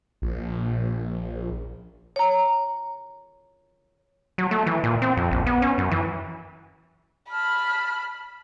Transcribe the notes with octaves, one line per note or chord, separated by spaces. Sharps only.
A#1
C#5 A#5
F#3
A3
E3
A#2
C4
F2
A#1
B3
C#4
F#2
E3
A5 B5 F6